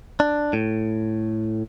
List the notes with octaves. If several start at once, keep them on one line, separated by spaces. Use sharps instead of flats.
D4
A2